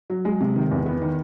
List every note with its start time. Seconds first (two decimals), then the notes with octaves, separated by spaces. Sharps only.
0.10 F#3
0.25 G#3
0.40 C3
0.56 D#3
0.71 E2
0.86 B3
1.02 D#3